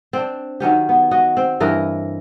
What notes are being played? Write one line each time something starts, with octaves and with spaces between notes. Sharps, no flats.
C4 D4
D#3 F#3 C#4 G4
B3
F#4 D#5
C4
G2 E3 A#4 D#5